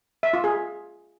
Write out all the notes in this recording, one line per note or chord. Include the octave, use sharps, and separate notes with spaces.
E5
F4
G#4